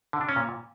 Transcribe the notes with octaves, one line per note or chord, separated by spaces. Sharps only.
D3
D4
C#4
A#2